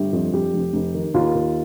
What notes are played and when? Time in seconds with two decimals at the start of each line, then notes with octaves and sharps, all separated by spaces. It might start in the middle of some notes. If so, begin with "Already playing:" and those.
Already playing: G1 G4
0.13 F2
0.33 F2 G4
0.54 F1
0.73 F1
0.94 D#3
1.14 D#2 F4
1.35 D#2